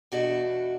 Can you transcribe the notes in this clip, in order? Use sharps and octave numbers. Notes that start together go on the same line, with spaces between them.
E2 B2 A3 D4 F#4